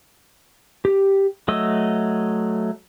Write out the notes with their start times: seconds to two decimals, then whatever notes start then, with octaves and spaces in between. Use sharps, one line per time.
0.85 G4
1.48 F#3 A3 D#5 E6